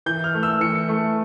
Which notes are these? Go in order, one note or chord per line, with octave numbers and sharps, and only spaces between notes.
E3 G6
F6
A3
E6
E3 C#7
A3